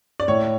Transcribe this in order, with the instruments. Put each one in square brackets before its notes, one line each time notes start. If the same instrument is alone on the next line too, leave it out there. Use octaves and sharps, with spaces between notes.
[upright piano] D5
[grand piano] A2 [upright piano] C#5